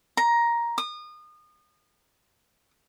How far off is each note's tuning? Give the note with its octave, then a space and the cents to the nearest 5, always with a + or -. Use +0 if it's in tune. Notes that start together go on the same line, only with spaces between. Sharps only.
A#5 +10
D#6 -30